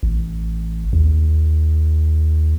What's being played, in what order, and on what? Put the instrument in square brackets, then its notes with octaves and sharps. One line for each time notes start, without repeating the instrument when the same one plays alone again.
[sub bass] A1
D#2